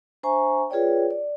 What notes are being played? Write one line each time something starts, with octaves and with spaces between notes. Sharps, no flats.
D4 C5 E5 G#5 A#5 C#6
F4 G#4 B4 C#5 D5 G5
D5